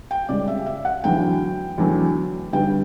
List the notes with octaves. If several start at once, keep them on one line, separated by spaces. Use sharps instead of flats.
G5
C#2 C#3 G3 D5
E5
E5
F#5
E2 D3 F#3 A3 G5
E2 D3 F#3 A3
G1 G2 D3 G3 G5